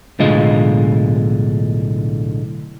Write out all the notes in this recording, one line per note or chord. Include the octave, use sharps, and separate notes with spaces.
B1 A2 D3 G#3 F4 D#5